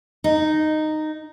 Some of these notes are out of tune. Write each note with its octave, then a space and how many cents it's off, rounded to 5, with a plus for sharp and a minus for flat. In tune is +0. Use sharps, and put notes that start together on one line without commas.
D#4 -10